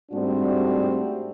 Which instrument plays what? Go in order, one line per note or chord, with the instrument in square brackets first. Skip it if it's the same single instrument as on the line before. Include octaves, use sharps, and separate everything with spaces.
[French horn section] G#2 G3 A3 C4 D4 F#4